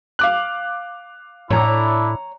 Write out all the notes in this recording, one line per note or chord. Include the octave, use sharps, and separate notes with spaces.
F5 D6 F#6
A2 D4 E4 C#5 A#5